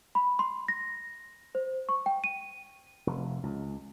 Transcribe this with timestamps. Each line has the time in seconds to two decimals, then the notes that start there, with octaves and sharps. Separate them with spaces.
0.15 B5
0.39 C6
0.68 A#6
1.55 C5
1.89 C#6
2.06 G5
2.24 D#7
3.07 F1
3.43 C#2